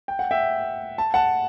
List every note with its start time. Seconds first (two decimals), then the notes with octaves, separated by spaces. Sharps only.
0.08 G5
0.19 F#5
0.31 E5 G5
0.98 A5
1.14 F#5 A5